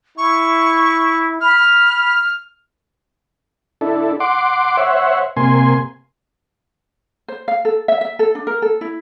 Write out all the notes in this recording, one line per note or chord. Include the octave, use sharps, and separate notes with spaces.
E4 C#6
B5 F6
D4 E4 A4
F#5 C6 D6
C5 C#5 E5 F#5
C3 A#3 G#5 C6
C5
F5
A4
E5
E5
A4
D4
A#4
A4
E4